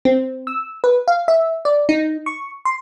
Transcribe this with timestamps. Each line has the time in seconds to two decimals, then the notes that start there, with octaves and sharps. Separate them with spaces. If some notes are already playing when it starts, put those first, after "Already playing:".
0.05 C4
0.47 E6
0.84 B4
1.08 F5
1.28 E5
1.65 D5
1.89 D#4
2.26 C#6
2.65 C6